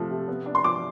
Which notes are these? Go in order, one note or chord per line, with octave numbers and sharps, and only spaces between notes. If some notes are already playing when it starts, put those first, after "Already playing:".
Already playing: C3 F3 A3
C3
B3
D4
C6
F3 D6